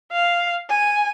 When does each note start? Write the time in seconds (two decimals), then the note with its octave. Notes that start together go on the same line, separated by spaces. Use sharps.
0.12 F5
0.70 G#5